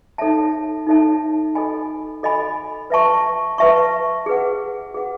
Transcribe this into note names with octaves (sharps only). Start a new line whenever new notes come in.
D#4 A4 C#5 E5 A5
D#4 A4 C#5 E5 A5
A4 D#5 G#5 B5
A4 D#5 G#5 B5
B4 E5 A5 C#6
B4 E5 A5 C#6
G#4 B4 F#5
G#4 B4 F#5